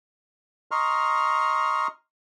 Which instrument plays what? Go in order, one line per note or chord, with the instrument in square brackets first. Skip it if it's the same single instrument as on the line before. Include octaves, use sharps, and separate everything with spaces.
[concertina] D#5 A#5 C6 C#6 F6